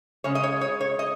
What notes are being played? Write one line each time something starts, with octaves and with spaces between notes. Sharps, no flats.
C#3 G#3 C#5
D#5
C#5
C#5
C#5
D#5